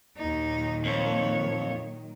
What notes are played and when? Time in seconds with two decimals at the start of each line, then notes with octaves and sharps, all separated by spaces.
0.17 D#2 A#2 D#3 F#3 D#4
0.85 F2 C#5